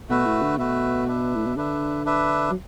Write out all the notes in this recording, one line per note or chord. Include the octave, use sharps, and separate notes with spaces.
B2 A3 F#4 B4 E5
A2
D3
B2 A3 F#4 B4 E5
D4 B4 E5
A2
B2
D3 D4 B4 E5
D4 B4 E5
F#3